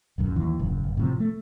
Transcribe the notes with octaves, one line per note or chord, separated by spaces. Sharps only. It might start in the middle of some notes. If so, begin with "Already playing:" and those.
D1 B1 F#2
D#2 E3
D#1 F#2 C#3
F#1
A2 C3 F3
A3